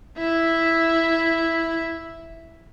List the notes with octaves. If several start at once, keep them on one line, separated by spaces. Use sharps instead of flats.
E4 E5